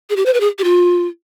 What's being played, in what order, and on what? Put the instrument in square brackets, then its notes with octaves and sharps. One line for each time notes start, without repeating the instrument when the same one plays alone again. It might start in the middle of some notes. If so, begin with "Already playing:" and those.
[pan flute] G#4
G4
C5
B4
G#4
G4
F4